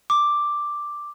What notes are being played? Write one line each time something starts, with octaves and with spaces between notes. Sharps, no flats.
D6